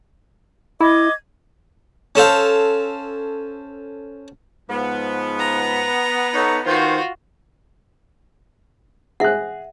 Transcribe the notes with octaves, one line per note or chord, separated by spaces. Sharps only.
E4 D#5 D6 G#6
C#4 A4 C5 F5
G#2 F3 B3
A#5
D#4 A4 C#5
D#3 F4 F#4 B4 C5
G#4 E5 F#5 F#6